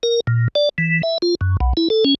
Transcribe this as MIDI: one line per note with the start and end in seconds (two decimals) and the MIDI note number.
0.03 0.20 70
0.27 0.48 46
0.55 0.69 74
0.78 1.02 52
1.03 1.18 76
1.22 1.35 65
1.41 1.57 42
1.60 1.73 35
1.77 1.88 64
1.90 2.04 69
2.05 2.15 61